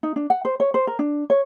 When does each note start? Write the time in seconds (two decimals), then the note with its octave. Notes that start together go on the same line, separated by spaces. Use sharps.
0.03 D#4
0.16 D4
0.30 F#5
0.45 C5
0.60 C#5
0.74 C5
0.87 A#4
0.99 D4
1.30 C#5